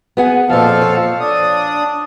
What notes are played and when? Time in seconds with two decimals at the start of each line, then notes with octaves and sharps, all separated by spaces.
0.17 B3 G#4 F#5
0.50 F2 A#2 F3 A4 F5
0.81 C#5
1.20 D4 D#6